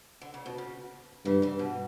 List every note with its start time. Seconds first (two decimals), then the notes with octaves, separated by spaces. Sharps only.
0.21 D3
0.34 C#3
0.46 B2
0.58 C#3
1.25 G2 C#3 E3
1.42 C#3 E3
1.59 B2